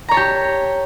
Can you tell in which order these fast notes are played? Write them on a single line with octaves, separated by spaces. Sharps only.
A#5 C#5 A5 G4